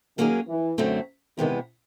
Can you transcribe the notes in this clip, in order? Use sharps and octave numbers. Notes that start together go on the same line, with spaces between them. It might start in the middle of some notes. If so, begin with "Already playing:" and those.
D#3 F#3 A#3 C#4 E4 G#4
E3
F#2 D3 F#3 A3 C4
E2 C3 D#3 E3 G#3 B3